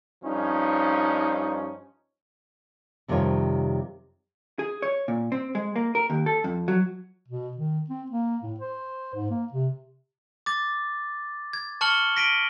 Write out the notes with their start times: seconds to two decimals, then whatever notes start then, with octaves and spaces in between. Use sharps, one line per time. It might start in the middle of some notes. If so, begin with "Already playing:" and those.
0.24 G2 F3 C#4 D#4
3.08 F2 C3 D#3 G3 F4 C#5
4.59 G#4
4.82 C#5
5.08 A#2
5.32 C4
5.55 G#3
5.76 A#3
5.95 A#4
6.10 D#2
6.26 A4
6.44 F2
6.68 F#3
7.28 B2
7.57 D#3
7.89 C4
8.10 A#3
8.43 A2
8.60 C5
9.15 G#2
9.30 A#3
9.53 C3
10.46 D6 A6
11.53 G#6
11.81 A5 C#6 F6 C#7 F#7 G7
12.16 A#6 B6 D7 D#7 F#7 G7